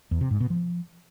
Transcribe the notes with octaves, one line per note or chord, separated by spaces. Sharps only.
E2
C3
G#2
B2
F3